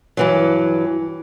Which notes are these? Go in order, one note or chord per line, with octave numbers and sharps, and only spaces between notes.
G2 E3 F#3